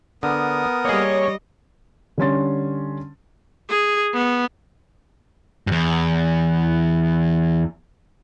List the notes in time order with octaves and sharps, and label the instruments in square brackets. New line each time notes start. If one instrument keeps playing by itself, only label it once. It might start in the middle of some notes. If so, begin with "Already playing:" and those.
[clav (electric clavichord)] D3 [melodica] B3 A#4 D#6
[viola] G3 D#5 [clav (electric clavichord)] A#3 G#4 [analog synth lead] C#5
[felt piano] D3 G3 C#4 C6 A6
[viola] G#4
B3
[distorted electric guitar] E2 G2